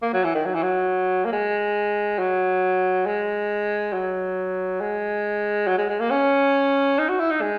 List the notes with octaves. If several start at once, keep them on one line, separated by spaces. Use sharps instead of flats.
A#3
F#3
E3
D#3
F#3
E3
F#3
A#3
G#3
F#3
G#3
F#3
G#3
F#3
G#3
G#3
A#3
C#4
D#4
F#4
E4
D#4
G#3